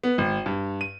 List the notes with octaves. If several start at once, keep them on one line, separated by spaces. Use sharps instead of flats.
B3
G#1
G2
D#7